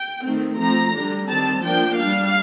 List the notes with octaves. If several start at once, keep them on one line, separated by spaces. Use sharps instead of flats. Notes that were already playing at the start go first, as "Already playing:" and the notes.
Already playing: G5
D#3 A3 C4
F3 A3 C4 A#5
D3 G3 D4
D#3 G3 C4 A5
F3 A#3 D4 G5
G3 D4 F5